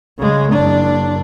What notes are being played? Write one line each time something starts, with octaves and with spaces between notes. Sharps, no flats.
C#3 G#3
F#1 D4